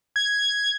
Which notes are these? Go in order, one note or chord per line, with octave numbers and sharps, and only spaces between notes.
G#6